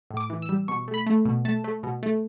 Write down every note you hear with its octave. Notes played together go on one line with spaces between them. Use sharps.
A2
D6
E3
E6
G3
B2 C#6
A3
B5
A3
B2
A3 A5
A3
B2
A3